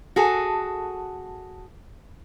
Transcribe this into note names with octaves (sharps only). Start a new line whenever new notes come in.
F#4 G#4 A4